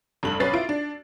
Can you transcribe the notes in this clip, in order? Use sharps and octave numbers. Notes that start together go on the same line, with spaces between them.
F1 G2 F#7
B1 C#4 B4 A6 C7
E4 F4 D7
D4